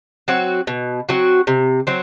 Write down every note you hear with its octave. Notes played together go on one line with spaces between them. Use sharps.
F#3 C4 F#4
B2
F#3 C4 F#4
C3
F#3 C4